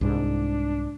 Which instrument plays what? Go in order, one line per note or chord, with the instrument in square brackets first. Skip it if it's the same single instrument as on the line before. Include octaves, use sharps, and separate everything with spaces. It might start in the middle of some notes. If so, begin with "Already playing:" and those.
[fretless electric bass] C2 G#2 [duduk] D4